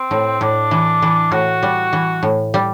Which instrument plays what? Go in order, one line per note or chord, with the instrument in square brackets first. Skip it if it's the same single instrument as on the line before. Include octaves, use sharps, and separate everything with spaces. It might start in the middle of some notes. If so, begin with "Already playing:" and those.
Already playing: [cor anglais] C4
[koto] A2
[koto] A2 [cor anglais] D4
[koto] E3
E3
[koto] A2 [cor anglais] F#4
[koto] G3
E3
A2
G3